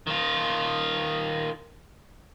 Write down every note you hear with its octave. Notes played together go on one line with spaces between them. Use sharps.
D#3 F4